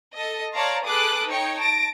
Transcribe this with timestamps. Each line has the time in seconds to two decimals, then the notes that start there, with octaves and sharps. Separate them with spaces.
0.15 A4 D#5
0.53 C#5 D5 F5 A5 A#5 C6
0.84 G#4 A4 B4 D6 D#6 F#6
1.28 D#4 C#5 G5 C#7
1.59 A5 A#6 D7